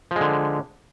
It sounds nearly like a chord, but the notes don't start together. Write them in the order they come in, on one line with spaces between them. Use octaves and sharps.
F3 G#3 D3